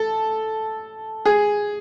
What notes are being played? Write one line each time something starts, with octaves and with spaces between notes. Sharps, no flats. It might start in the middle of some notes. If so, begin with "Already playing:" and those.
Already playing: A4
G#4